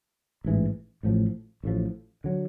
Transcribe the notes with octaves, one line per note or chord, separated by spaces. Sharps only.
A1 G#2 E3
A1 A2 F3
A1 A2 F3
D3 F#3